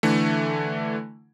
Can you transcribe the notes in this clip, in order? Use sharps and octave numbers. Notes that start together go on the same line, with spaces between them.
D3 E3 A3